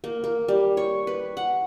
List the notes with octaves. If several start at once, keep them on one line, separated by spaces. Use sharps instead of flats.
A#3
A#3
G3
C#5
B4
F#5